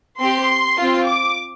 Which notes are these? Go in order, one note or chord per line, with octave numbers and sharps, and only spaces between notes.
C4 G4 C6
C4 F4
D6